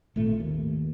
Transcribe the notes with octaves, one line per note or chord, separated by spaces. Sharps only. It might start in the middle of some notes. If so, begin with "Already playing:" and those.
G#1 A#2 A3
D#2